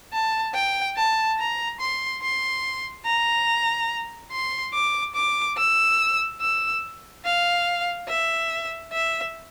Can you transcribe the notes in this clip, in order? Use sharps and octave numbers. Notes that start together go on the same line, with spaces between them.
A5
G5
A5
A#5
C6
C6
A#5
C6
D6
D6
E6
E6
F5
E5
E5